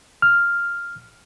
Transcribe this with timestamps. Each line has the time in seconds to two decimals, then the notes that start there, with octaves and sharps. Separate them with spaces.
0.22 F6